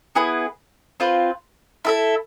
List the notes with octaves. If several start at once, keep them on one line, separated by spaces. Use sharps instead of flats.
B3 E4 G#4 B4
C4 F4 B4
E4 A4 E5